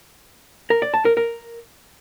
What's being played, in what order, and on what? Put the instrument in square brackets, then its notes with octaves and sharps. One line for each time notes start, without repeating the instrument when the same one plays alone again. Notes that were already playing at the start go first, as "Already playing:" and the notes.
[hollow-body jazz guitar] A#4
D5
A5
A#4
A#4